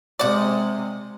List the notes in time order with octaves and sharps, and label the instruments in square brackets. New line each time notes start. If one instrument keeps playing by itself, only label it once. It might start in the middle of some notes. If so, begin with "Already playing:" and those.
[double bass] C3 G#3 [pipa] D5 F#5